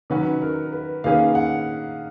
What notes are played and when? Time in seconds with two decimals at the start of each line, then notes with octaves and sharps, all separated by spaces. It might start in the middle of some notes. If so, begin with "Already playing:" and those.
0.10 D#3 F#3 C#4 F#4 B4
0.42 A#4
0.72 B4
1.04 D#3 A#3 C#4 G#4 B4 F5
1.35 F#5